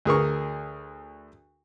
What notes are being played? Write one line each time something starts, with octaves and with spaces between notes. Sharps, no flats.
D2 G#4 A#4 C#6